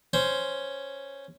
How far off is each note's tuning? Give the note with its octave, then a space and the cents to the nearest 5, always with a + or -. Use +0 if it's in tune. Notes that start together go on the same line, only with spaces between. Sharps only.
C#4 +0 C5 +0